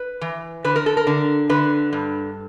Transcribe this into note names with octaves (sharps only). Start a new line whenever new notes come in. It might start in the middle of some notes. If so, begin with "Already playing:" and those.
Already playing: B4
E3
D3 B4
A#4
A4
A#4
D3
D3 B4
G2